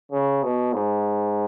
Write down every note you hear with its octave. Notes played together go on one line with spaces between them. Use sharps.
C#3
B2
G#2